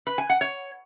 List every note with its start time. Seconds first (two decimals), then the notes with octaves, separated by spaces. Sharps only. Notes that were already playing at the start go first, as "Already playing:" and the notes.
0.07 B4
0.18 G#5
0.29 F#5
0.41 C#5